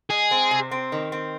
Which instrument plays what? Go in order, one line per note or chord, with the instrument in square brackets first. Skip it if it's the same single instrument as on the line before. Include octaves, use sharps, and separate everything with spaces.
[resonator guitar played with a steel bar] G#3 [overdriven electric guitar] G#4
[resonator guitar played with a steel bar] C4
C3
C4
D#3
C4